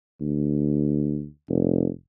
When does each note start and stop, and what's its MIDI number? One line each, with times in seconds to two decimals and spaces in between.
0.21 1.27 38
1.48 1.88 29